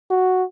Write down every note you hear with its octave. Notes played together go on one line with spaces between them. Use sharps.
F#4